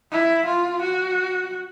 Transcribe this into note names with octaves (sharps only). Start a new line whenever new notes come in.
E4
F4
F#4